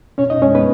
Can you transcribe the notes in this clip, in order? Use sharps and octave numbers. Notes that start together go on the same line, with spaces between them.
B2 C#4 C#5
D#4 D#5
G#3 C#4 C#5
B3 B4